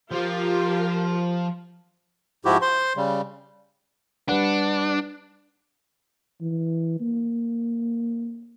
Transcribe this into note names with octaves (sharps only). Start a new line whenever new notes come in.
F3 F4 G4 A#4
G#2 F3 E4 F#4 G4
C5 C6
C#3 G3
G3 D4 B4 F#5
E3
A#3